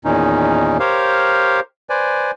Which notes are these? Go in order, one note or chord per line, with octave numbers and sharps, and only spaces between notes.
E2 A#2 D#3 C#4 D#4
G4 A#4 C5 C#5 F5
B4 C5 D5 G#5